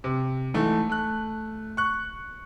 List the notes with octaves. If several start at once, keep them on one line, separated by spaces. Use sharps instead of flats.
C3
G#2 E3 A3 A4
A3 F#6
C#6 F#6